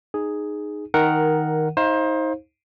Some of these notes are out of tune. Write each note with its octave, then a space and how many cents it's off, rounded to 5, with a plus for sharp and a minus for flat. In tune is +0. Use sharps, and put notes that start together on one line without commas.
D#4 -15 G#4 +0
D#3 +10 A#4 +0 F#5 +0
D#4 +30 C5 +25 F5 +0